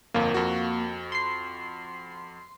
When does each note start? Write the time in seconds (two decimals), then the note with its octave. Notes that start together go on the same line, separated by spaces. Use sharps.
0.14 G1 F2 A#3
0.34 F2 F#4
1.12 C6 C7